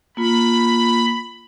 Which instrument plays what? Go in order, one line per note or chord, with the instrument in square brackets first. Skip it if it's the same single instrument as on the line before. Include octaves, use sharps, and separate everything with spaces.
[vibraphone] A#3 F4 [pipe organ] B5